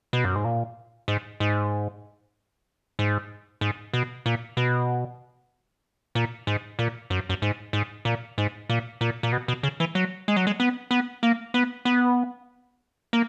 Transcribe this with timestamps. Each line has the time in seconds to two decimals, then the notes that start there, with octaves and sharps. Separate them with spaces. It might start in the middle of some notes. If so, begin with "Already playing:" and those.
0.13 B2
0.24 F#2
0.35 G#2
0.44 A#2
1.08 G#2
1.40 G#2
2.99 G#2
3.61 G#2
3.94 B2
4.26 A#2
4.57 B2
6.15 A#2
6.47 G#2
6.79 A#2
7.10 F#2
7.29 F#2
7.42 G#2
7.73 G#2
8.05 A#2
8.38 G#2
8.69 A#2
9.01 A#2
9.23 A#2
9.32 B2
9.48 B2
9.63 C#3
9.80 E3
9.95 F#3
10.28 G#3
10.36 F#3
10.47 G#3
10.60 B3
10.91 B3
11.23 A#3
11.54 B3
11.85 B3
13.13 A#3